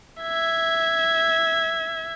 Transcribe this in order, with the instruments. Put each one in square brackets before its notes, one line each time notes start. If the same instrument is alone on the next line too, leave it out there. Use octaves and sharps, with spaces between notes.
[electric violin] E5 G#6